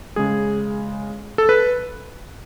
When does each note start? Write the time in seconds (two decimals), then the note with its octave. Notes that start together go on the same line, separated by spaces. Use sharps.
0.16 C#3 G#3 G#4
1.38 A4
1.49 B4